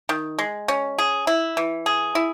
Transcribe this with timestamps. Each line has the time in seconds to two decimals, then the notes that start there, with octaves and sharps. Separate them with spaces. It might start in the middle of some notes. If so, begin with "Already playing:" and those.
0.09 D#3
0.38 G#3
0.68 C#4
0.98 G#4
1.27 E4
1.57 E3
1.86 G#4
2.15 E4